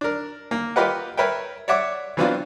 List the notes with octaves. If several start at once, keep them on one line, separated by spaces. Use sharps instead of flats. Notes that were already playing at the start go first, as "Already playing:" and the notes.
D4 A#4
A#3
F4 G4 A#4 B4 D#5 F#5
A#4 B4 C#5 E5 G5
C#5 D5 E5 F#5 D6
E3 F#3 B3 C4 D4 F4